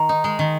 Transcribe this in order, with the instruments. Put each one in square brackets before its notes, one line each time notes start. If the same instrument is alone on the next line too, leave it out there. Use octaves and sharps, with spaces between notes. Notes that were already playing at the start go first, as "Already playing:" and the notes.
Already playing: [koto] D#3 [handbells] A#5
[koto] D#4
G#3
D#3